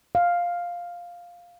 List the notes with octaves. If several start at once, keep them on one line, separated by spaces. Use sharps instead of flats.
F5